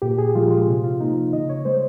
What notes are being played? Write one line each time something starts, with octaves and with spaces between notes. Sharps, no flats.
A#2 G4
G#4
F3 G#3 F4
F4
C3
F4
F3 A#3 D#4
C#3 D#5
C#5
G#3 C5